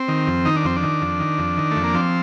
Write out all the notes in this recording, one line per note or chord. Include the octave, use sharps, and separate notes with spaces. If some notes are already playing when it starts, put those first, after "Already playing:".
Already playing: C4
D#3
F2
D#3 D#4
D4
F2 C4
D4
D#3
F2
D#3
F2
D#3
A3
F2
A#3
F3 C4